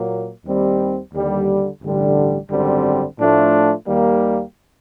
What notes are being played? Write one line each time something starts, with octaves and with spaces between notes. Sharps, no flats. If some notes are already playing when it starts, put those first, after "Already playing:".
Already playing: A#2 F#3 A#3
D#2 D#3 G3 C4
D#2 D3 G3
A1 G2 D3 G3
G#1 F#2 D3 G3 C4
A2 F3 A3 D4 F4
D#2 D#3 G3 A#3